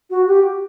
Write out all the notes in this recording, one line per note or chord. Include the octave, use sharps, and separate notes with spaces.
F#4
G4